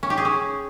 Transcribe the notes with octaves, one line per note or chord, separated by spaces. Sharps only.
C#4
G4
G#4
C#4